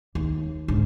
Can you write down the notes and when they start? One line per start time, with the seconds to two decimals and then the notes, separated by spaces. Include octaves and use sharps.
0.15 D#2
0.68 G#2 D3